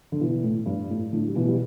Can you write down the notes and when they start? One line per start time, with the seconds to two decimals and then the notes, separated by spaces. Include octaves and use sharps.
0.12 D3
0.20 B2 E3
0.43 A2
0.66 G2
0.90 A2
1.12 A2 D3
1.28 G3
1.35 B2 E3
1.48 G3